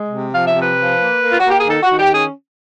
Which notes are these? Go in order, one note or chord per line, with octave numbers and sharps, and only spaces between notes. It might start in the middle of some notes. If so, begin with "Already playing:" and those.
Already playing: G#3
C3
F3 F5
E5
C3
B4
F3
A#3
A#3
F4
F#4
A#3 G4
G#4
D#3 A4
F#4
D#3
G4
C#4 G#4